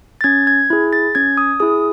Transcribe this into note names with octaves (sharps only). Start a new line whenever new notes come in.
A6
C#4 G#6
G#6
E4 G#4
A6
C#4 G#6
D#6
E4 G#4 D#6